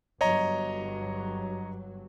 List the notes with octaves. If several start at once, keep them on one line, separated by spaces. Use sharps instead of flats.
G1 G2 F#3 C#5 D#5 A#5